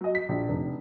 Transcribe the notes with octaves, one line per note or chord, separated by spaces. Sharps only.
F#3 D#5
B6
A#1
F1